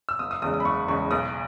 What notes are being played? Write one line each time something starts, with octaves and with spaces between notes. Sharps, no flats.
E6
F#1 D#6
D#6
E2 C#3 G#3 D#6
D#6
B5
F#1 C#6
E2 C#3 G#3 C#6
B1 D#6